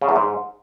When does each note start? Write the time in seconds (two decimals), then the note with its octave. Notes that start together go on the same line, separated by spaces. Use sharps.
0.02 C#3
0.09 E2
0.16 G#2